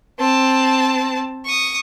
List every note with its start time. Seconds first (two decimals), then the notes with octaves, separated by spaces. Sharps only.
0.19 C4 A5
1.45 C#6 D#6